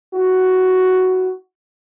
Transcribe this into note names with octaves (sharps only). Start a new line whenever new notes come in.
E4 F#4